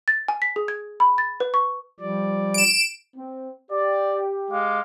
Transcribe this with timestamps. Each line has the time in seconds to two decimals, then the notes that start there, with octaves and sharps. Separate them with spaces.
0.08 A6
0.28 G#5
0.42 B6
0.56 G#4
0.68 G#6
1.00 B5
1.18 A6
1.40 B4
1.54 C#6
2.00 F3 G3 D5
2.54 D7 E7
3.16 C4
3.71 G4 D5
4.51 G#3 F5 D6